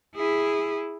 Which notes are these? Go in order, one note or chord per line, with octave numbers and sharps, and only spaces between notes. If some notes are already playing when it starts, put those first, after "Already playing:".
E4 G#4